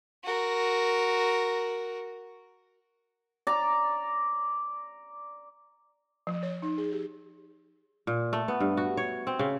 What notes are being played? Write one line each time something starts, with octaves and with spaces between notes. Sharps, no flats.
F#4 A#4
D5 A#5
F3
C#5
D#4
G#4
G4
A#2
A3
B3
G2
F#4
C#5
C4
C#3